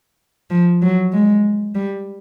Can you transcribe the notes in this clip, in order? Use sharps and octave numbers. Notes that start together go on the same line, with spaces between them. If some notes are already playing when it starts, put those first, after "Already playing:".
F3
F#3
G#3
G3